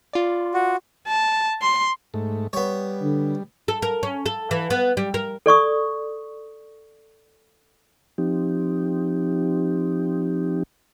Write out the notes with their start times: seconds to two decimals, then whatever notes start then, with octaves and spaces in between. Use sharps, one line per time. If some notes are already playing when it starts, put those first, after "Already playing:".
0.13 F4 D5
0.54 F#4
1.07 A5
1.62 C6
2.14 G#2 A3
2.53 G3 B3 C#5
3.03 D3
3.68 A4
3.82 A#4
4.03 C#4
4.26 A4
4.51 E3
4.70 B3
4.97 G3
5.14 A#4
5.46 A4 D5 C#6 D#6
8.18 F3 C4 D#4 G4